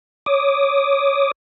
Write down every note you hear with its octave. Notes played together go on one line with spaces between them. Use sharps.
C#5 D6 D#6